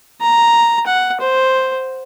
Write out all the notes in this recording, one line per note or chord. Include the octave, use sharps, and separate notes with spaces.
A#5
F#5
C5